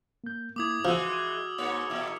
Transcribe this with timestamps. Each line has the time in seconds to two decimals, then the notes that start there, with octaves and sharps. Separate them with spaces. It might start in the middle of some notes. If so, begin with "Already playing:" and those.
0.24 A#3 G6
0.56 A#3 E4 D6 D#6 G#6
0.85 E3 F3 G#3 F#4 E6 F6
1.58 G#2 A#3 C#5
1.90 A#2 A#3 E4